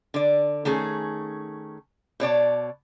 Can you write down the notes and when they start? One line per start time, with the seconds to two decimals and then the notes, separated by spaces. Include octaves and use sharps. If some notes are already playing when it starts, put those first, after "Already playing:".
0.14 D3 D5
0.65 D#3 A3 C#4 G#4
2.20 B2 C#5 D5 A5